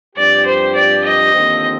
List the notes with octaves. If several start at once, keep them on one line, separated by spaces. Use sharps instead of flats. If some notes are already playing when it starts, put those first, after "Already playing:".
G2 F3 C4 G4 D5
C5
D5
D#5
D#2 D3 F3 C4